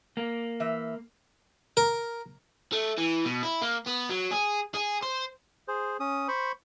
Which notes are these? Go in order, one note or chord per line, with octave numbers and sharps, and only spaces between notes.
A#3
E3 E5
A#4
A3
E3
B2
E4
A#3
B3
F#3
G#4
G#4
C5
G#4 C5
C#4 D#6
C5 B5 C#6